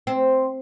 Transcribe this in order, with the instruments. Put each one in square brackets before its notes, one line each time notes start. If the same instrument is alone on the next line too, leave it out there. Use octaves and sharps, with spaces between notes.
[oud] C4